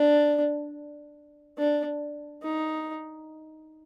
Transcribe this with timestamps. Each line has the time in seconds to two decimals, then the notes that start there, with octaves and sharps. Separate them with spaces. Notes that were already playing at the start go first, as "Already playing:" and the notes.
Already playing: D4
1.58 D4
2.43 D#4